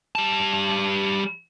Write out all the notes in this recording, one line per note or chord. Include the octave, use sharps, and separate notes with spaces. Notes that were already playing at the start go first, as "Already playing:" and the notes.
G3 A5